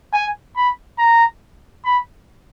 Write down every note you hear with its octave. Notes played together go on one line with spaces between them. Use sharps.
G#5
B5
A#5
B5